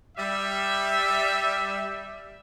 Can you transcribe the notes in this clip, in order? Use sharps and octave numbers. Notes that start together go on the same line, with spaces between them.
G3 E5